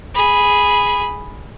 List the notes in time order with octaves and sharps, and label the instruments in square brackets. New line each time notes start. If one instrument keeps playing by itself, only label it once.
[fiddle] G#4 B5